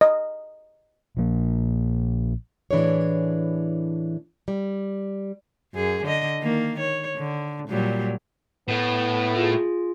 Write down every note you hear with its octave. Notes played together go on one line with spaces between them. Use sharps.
D#5
A#1 F3 A#3
A2 E3 D4 G#4 C#5
G3
F#2 G#4
D3 D#5
D#3 A#3
C#5
D3
A#2 F#3 G3
A2 A3 B3
F4 G#4